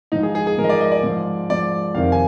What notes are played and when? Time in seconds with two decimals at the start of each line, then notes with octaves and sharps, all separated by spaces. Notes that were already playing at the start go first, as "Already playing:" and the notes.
0.12 G#2 F3 D#4
0.23 G#4
0.35 G#4
0.47 G#4
0.58 G#2 A#4
0.63 F3 D#5
0.69 D5
0.81 D#5
0.92 D5
1.03 G#2 F3
1.50 G#2 F3 D5
1.94 F2 C3 D#3 F5
2.12 G#5